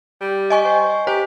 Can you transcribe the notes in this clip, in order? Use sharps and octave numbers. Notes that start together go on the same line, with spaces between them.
G3
D#5 G#5 C#6
C5
G4 C5